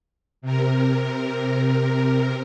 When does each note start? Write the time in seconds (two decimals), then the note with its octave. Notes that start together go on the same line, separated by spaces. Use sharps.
0.42 C3 A#4